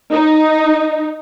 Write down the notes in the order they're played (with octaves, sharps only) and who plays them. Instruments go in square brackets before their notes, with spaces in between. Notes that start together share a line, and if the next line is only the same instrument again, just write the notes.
[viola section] D#4